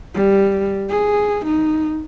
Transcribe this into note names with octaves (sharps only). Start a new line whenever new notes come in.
G3
G#4
D#4